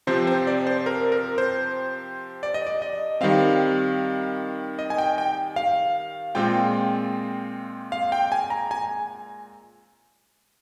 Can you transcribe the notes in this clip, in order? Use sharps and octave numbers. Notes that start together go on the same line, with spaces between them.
C3 F3 C4 C5
C5
D5
C5
A#4
A#4
C5
D5
D#5
D5
D#5
D#3 G3 C4 F5
D#5
G#5
G5
G5
F5
A#2 G#3 C4 F4 G5
F5
G5
G#5
A#5
G#5